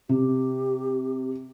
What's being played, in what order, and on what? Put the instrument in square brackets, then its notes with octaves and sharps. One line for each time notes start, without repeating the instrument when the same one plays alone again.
[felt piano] C3 [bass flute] G4